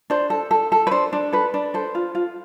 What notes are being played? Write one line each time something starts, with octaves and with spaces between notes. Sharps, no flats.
D4 C5
A4
A4
A4
B4
D4 C5
D4
A4 B4
D4
A4 C5
F4
F4